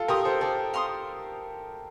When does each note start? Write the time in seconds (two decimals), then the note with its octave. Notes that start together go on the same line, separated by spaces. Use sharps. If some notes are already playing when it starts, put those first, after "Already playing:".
Already playing: F4 A4
0.08 G4 A#4 F5 C6 D#6
0.25 A4 C5
0.41 A4 C5 D5
0.74 F5 C6 D#6